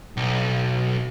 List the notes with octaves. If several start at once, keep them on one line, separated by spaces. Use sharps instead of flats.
B1